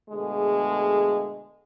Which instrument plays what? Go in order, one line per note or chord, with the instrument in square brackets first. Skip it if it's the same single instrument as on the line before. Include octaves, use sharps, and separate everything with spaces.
[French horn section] B2 D3 G#3 A3 G#4 A4